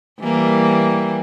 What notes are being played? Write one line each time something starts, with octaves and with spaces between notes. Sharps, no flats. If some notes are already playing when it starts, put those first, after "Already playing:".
E3 G3 A#3